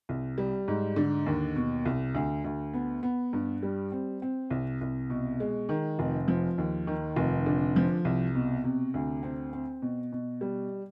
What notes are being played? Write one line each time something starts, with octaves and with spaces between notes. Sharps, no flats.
C2
G3
G#2
D3
D#2
B2
C2
D2
D2
B3
B3
G2
G3
C4
C4
C2
C2
B2
G#3
D#3
F1
F3
D#2
D#3
F1
D3
F3
C2
B2
C3
D2
C4
C4
B2
B2
G3